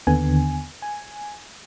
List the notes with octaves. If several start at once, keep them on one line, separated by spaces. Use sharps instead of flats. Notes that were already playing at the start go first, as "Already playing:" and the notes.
D#2 D3 B3 G#5
G#5